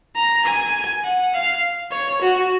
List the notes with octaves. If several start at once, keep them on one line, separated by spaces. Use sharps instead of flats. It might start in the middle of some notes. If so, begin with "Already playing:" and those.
A#5
G#5
F#5
F5
C#5
F#4